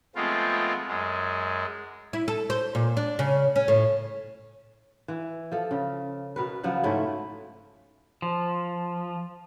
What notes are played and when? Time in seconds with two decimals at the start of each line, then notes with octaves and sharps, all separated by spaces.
0.15 F3 G#3 A3 B3 C4 F4
0.87 F#2 G#3
2.13 E4
2.28 A4
2.50 C5
2.75 A#2
2.97 D4
3.19 C#3
3.56 C#4
3.68 A2
5.08 E3
5.52 F3 A4
5.71 C#3
6.36 B2 A#4 B4
6.63 C#3 F3 F#3 F#5
6.83 G#2 A3 C#4 E4
8.22 F3